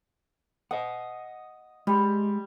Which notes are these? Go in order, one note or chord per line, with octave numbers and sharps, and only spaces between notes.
D#5 F#5 D#6
G3 G#3